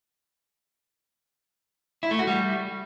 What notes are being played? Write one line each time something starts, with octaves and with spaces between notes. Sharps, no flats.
E4
A3
F#4
G3